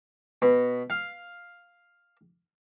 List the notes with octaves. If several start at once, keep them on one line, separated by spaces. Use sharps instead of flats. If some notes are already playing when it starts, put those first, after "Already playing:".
B2
F5